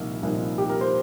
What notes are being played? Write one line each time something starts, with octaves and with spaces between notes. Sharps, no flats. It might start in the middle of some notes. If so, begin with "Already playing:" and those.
Already playing: C2 A#2 F3 A#3 D#4
C2 A#2 F3 A#3 D#4
G4
A#4
C5